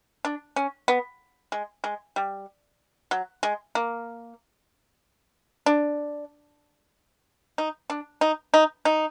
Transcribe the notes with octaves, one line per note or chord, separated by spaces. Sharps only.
D4
C#4
B3
G#3
G#3
G3
F#3
G#3
A#3
D4
D#4
D4
D#4
D#4
D#4